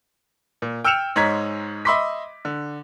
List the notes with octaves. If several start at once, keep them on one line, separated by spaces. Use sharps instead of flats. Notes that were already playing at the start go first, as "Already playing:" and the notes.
A#2
G5 E6 F6 C#7 E7 F7
G#2 G#3 C#5 A#5 G#6 B6
D#5 E5 B5 C6 D6 B6
D3